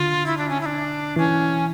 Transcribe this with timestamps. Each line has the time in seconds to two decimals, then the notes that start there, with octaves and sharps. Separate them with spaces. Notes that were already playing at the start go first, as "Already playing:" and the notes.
Already playing: D3 F4
0.26 E4
0.37 D4
0.49 C#4
0.61 E4
0.66 D4
1.16 E3 C#4